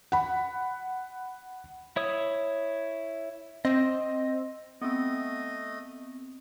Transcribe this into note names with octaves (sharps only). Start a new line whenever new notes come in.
F#5 B5
E4 C#5 D#6
C4 D#5
A3 B3 C4 D#5